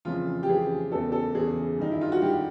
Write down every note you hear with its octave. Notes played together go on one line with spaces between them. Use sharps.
F2 C#3 E3 F4
G4
F2 C#3 E3 G#4
E2 C#3 E3 A4
A4
E2 C#3 E3 G#4
G2 D#3 D#4
E4
F4
F#4
G2 D#3 G4